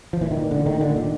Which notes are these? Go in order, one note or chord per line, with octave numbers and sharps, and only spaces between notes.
F3
A#2 E3
D#3
A#2
A2 D3
A2 D#3
A#2 D3
A#2 D#3